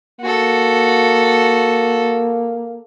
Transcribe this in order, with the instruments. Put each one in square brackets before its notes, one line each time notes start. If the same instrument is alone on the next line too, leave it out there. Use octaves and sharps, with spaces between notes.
[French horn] A#3 [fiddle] F#4 A4